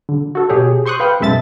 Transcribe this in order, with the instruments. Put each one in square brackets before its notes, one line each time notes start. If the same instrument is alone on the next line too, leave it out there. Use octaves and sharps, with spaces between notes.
[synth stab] D3
F#4 A4
B2 G4 G#4 C#5
C5 C6 C#6 D#6 F#6
B4 F5 G5
B1 F#2 G#3 E5 A5 A6